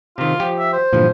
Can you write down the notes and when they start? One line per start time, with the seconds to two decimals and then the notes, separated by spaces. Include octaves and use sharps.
0.18 C3 D#3 F4
0.40 F3 G4
0.59 E5
0.73 C5
0.93 G2 A#2 D3 E3 F3